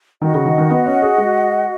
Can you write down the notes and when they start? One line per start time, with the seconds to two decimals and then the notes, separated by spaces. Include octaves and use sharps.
0.22 D#3 F#4 D#5 F#5
0.34 C#3
0.46 D#3
0.58 D#3
0.70 B3
0.86 C#4
1.02 G#4
1.18 G#3